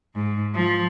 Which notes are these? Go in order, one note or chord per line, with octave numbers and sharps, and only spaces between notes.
G#2
F3